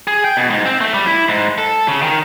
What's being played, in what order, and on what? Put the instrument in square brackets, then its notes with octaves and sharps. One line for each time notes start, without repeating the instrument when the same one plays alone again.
[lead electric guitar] G#4
G5
B2
G#2
C4
A3
G3
E4
G#2
A4
C#3
D#3